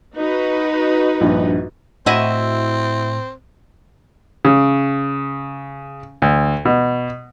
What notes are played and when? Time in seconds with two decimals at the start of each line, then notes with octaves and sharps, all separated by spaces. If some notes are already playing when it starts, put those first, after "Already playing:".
0.15 D#4 F#4 B4
1.21 A#1 G2
2.06 A2 C4 E4 F#4 D#5
4.45 C#3
6.22 D2
6.65 B2